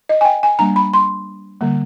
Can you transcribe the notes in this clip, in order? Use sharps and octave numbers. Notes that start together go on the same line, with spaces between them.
D#5
G#5
G5
G#5
G3 A#3 D4 A#5
B5
C6
D3 G3 A#3